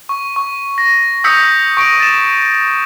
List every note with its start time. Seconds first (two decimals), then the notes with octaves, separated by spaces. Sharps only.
0.09 C#6
0.36 C#6
0.78 A#6
1.24 D#6 E6 G6 B6 C#7
1.77 C#6 A#6 D7
2.00 A6 E7